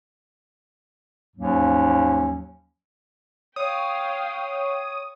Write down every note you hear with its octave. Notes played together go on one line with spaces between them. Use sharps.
D#2 G#2 F3 F#3 A#3 C#4
C#5 F5 G5 D#6